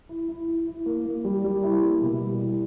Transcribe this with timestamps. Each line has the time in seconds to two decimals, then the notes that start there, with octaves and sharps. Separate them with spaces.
0.09 E4
0.28 E4
0.48 E4
0.67 E4
0.86 A#3
1.06 A#3
1.25 G3
1.44 G3
1.63 E4
1.82 A#3
2.02 B2
2.21 G3
2.40 E4